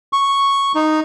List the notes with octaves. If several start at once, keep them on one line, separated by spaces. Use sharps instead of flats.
C#6
D#4